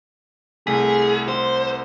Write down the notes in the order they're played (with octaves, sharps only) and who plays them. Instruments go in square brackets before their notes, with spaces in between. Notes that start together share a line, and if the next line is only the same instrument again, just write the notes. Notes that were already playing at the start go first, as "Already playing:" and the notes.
[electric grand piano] C2 A3 B6 [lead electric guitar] G#4
[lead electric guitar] C5